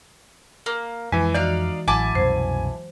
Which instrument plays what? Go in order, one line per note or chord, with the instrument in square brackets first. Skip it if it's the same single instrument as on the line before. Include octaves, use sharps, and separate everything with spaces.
[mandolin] A#3
[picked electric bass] F2 [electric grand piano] E3 G#5 [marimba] G#3
[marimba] E3 F#4 [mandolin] D#4 F5 [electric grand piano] D5
[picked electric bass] A1 [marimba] F#3 [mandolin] E4 A5 D6 [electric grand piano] G#5
[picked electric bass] C2 F#2 B2 [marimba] C5